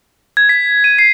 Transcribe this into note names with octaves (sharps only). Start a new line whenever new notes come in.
G#6
B6
D#7
C7